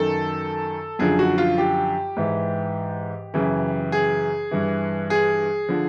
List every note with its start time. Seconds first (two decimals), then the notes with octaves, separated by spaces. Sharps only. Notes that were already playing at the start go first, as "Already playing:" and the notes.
Already playing: F#2 D#3 A4
0.99 F#2 D3 F3 G#4
1.19 F#4
1.38 F4
1.58 G4
2.16 G#2 E3
3.34 F#2 C#3 E3
3.92 G#4
4.51 G2 E3
5.10 G#4
5.69 D3 F3